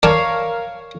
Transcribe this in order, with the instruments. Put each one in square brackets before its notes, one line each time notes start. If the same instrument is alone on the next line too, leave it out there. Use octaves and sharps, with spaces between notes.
[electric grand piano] A#4 [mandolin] C#5 F5 [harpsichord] D5 A5